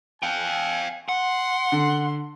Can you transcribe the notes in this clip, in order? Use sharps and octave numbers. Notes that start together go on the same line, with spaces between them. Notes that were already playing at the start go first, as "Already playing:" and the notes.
F5 G5 G#5
F#5 C6
D3